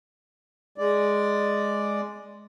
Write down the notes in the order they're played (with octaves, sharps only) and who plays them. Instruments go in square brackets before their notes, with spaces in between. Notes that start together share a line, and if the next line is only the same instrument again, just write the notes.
[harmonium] G#3 D5